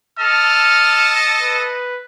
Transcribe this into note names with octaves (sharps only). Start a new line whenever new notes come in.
A4 D#5 A5 F6
B4